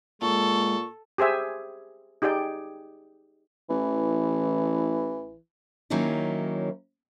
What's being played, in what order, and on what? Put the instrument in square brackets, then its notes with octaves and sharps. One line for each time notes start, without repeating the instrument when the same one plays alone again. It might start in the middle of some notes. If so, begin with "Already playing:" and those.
[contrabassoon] A#2 [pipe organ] G#3 [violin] A4 [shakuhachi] C#6
[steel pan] G4 G#4 C5 E5 G#5
D#4 G4 G#4 D5 G5
[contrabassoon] A1 [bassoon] E3
[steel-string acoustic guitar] D#3 F#3 A#3 C#4 D#4 E4